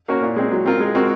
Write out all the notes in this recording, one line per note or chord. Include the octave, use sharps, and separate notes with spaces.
A#3 C#4 F#4 A#4
A#2
G#3 C4
F#3
C4 F4 A#4
G#3
C4 F#4 A#4